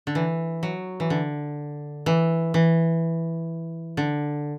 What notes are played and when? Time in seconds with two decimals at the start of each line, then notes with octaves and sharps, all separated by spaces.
0.07 D3
0.15 E3
0.63 F#3
1.00 E3
1.10 D3
2.06 E3
2.54 E3
3.97 D3